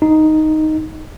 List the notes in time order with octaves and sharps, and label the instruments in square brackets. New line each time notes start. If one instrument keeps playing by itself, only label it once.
[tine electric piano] D#4